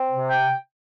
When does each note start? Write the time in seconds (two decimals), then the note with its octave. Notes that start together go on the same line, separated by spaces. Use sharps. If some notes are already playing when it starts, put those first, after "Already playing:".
Already playing: C4
0.11 C3
0.30 G5